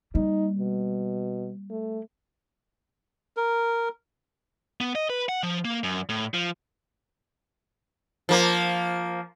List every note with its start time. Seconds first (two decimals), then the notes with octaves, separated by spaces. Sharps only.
0.15 G3 A#3 D#4
0.59 B2
1.70 A3
3.37 A#4
4.81 B3
4.95 D#5
5.10 B4
5.29 F#5
5.43 F3
5.65 A#3
5.84 F#2
6.09 A2
6.34 F3
8.29 F3 A#3